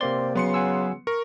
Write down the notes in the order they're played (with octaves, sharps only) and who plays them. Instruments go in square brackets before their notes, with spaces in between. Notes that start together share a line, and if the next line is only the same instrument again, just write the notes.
[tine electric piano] C3 A#3 D5 [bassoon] C4 [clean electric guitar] C6
[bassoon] C#3 [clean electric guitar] F#3 [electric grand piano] B3 C6 C#7
[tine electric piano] F#5 G#5 E6
[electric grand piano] A#4 [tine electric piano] C#6